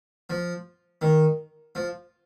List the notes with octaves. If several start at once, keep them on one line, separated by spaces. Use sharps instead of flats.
F3
D#3
F3